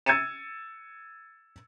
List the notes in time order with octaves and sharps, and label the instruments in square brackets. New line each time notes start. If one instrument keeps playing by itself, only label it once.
[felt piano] E6 G#6 A6 C#7 D#7 E7